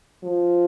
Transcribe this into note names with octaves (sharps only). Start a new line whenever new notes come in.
F3